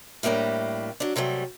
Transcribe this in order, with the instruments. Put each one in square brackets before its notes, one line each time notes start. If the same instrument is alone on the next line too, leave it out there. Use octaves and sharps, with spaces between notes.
[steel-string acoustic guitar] A2 G3 A#3 C#4 D4
F#3 D4
C3 F#3 G3 A3